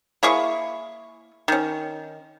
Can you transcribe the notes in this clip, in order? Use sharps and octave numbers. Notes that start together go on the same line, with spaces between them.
A#3 E4 G#4 C#6
D#3 C#4